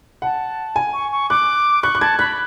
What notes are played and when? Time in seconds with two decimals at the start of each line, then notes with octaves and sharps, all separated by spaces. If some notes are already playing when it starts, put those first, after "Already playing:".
0.22 F#5 A5
0.76 G#5
0.93 C#6
1.12 C#6
1.30 D6 F#6
1.82 C#6 F#6
1.95 F#6
2.01 A5 G#6
2.19 B5 F#6